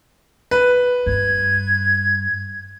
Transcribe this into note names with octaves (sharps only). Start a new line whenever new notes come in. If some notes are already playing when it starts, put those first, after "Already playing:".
B4
G2 G#6